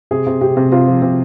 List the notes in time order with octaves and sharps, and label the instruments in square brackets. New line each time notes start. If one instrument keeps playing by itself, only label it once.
[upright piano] C3 G#4
C3
C3 G4
C3
C3 F4
F3
C3